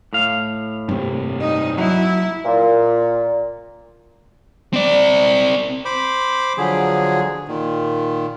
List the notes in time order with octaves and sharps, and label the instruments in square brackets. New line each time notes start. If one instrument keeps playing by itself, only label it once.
[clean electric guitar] A2 F5
[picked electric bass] G2 C3
[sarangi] D#4
[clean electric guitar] F#3 [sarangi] E4
[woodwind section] A#2
[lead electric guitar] C4 D5
[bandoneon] C5 B5 D6
D3 F3 F#3 G#4
A#2 D#3